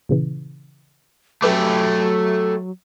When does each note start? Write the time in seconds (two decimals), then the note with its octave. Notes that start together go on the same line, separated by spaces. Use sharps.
0.09 A#2 C#3 E3
1.42 F#3 A3 G4 A4 B4 D6